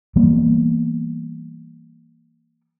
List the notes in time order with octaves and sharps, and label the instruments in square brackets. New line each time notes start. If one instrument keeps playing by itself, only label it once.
[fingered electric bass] E3 G3 A#3 B3